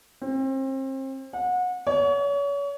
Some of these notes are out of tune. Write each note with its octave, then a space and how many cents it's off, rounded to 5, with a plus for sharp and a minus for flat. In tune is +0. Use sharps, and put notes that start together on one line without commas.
C4 +35
F#5 -30
C#5 +35